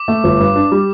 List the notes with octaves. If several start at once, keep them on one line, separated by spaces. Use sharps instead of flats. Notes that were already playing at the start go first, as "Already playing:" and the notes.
Already playing: D6
A3
G1
G2
D4
G3